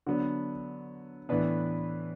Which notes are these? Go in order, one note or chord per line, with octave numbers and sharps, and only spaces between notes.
D3 F#3 B3 D4 F#4
A2 E3 B3 D4 B4